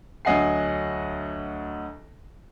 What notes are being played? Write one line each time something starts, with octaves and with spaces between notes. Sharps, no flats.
D2 F#3 D#5 F#5 G#5 C7